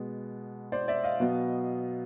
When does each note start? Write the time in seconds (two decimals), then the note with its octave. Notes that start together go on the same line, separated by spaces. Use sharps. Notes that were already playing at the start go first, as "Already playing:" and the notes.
Already playing: B2 G#3 B3
0.72 C5 D5
0.88 D5 E5
1.04 D#5 F5
1.20 B2 F#3 B3